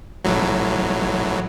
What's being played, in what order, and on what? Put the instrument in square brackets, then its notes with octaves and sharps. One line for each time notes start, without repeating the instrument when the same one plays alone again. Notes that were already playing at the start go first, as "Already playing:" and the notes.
[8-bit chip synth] A1 A2 F#3